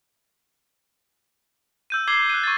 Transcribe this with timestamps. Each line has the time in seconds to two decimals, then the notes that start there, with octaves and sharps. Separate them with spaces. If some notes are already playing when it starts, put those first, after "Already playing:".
1.90 E6 G6 D#7
2.08 D6 G#6 C7 F#7 G7
2.30 F#6 D#7
2.44 C#6 G#6 A6